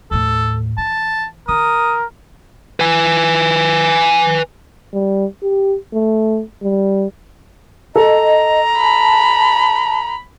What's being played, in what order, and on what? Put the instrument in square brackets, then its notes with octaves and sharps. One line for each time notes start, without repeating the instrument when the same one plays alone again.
[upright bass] D#2 A2 [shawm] A4
[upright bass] E3 [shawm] A5
[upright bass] D#3 [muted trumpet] A#4 [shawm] D#6
[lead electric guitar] B4 G#5
[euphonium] G3
G4
A3
G3
[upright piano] A4 [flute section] D#5 [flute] A#5
[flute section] A5 [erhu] B5